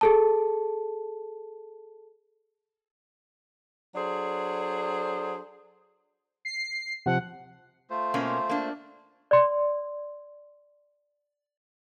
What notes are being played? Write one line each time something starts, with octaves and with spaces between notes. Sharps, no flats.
G#4 A4 A5
F#3 D4 G#4 A4 C5
C7
C3 F3 F#5
A3 F4 C5
B2 A#3 C#4
A#3 D4
D5 C6